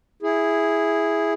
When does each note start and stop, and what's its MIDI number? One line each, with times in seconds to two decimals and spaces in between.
0.22 1.33 64
0.22 1.33 68